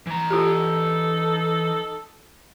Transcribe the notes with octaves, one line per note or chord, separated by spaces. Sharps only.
E3 A#5
D#4 F4 G4 A4